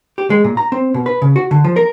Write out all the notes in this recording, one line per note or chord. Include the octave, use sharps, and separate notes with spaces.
G4
G#3
A#2
A#5
C4
B2
B4
C#3
F#4
D3
F3
A#4